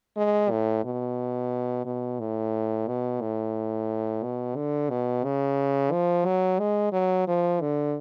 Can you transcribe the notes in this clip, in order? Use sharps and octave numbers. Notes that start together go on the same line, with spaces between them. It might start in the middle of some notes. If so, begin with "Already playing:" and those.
G#3
A2
B2
B2
A2
B2
A2
B2
D3
B2
C#3
F3
F#3
G#3
F#3
F3
D3